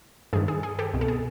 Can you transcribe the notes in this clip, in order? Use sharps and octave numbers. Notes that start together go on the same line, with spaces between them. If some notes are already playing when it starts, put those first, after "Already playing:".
G2 D#3 G#4
G#4
G#4
G4 A4
C2 B2
A4
G#4